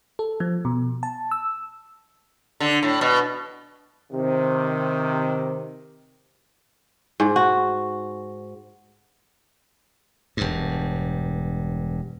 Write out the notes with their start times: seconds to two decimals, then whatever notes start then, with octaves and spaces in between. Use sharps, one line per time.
0.19 A4
0.40 F3
0.65 B2
1.03 A5
1.31 E6
2.60 D3
2.83 A2
3.01 B2
4.12 C3 D#3
7.20 G#2
7.36 F#4
10.37 E1 G2